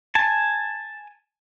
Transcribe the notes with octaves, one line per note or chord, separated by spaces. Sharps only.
G#5 A5